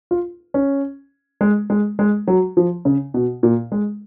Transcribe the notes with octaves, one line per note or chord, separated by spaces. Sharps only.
F4
C#4
G#3
G#3
G#3
F#3
F3
C#3
B2
A#2
G#3